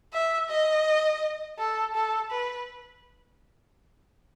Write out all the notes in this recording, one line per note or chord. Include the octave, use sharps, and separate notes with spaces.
E5
D#5
A4
A4
B4